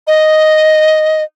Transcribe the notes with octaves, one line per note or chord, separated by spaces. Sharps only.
D#5